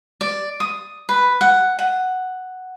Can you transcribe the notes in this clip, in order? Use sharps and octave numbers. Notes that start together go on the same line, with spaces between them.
D5
D#6
B4
F#5
F#5